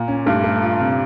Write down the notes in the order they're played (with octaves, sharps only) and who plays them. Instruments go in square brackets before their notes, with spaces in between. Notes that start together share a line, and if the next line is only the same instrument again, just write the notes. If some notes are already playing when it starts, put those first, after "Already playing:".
Already playing: [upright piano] A#2
[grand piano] C#4
[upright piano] G2 [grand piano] A3
[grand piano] A3
F4
C3